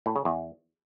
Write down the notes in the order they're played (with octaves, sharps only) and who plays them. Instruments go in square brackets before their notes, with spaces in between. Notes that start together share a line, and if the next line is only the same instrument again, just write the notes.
[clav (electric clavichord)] A2
C#3
E2